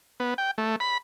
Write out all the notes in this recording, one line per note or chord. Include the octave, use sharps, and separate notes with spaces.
B3
G5
A3
B5